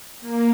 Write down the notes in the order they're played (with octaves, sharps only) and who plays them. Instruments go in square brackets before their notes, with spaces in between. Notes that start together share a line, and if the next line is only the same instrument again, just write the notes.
[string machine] A#3